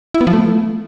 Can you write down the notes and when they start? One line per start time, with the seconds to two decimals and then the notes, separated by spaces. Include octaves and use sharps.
0.14 E4
0.21 B3
0.27 F3
0.33 A3